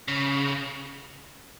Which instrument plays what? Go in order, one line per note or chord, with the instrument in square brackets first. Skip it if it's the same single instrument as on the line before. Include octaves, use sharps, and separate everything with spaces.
[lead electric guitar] C#3